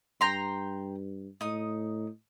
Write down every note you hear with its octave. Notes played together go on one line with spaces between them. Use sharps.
G2 G5 A#5 C6
A2 D#4 D#6